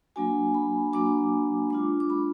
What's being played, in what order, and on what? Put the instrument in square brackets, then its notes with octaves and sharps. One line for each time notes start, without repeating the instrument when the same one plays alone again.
[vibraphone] F#3 A#3 D4 F#4 G#5
B5
F#3 A#3 D4 F#4 D6
G#3 D4 F4 D6
D6
B5